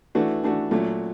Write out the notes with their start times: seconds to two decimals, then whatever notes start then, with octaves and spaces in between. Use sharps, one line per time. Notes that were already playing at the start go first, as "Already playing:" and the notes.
0.15 E3 A3 D4 F#4
0.43 E3 A3 D4 F#4
0.71 A#2 F#3 A3